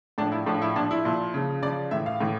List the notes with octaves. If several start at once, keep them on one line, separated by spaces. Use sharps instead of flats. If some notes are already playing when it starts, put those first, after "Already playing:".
A2 F3 D4
E4
A2 F3 D4
E4
A#2 F3 D4
E4
A#2 F3
C#3 F3
C#3 F3 D5
A2 E3 E5
F5
A2 E3